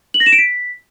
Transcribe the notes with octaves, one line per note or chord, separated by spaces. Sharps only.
F#7
A#6
E7
D7
B6